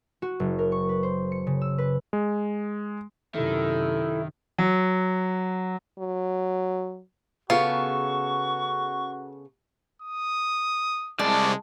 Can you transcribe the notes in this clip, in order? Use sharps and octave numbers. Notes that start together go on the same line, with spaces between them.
F#4
F#1
A#4
C#6
B4
C5
C#7
C#3
E6
B4
G#3
F#2 C3 D#3 E4 A4
F#3
F#3
C#3 B3 F4 F#4 A4 C#6
D#6
C2 G#3 D5 A5